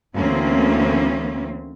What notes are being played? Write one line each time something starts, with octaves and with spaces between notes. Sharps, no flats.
D2 E3 A#3 C4 C#4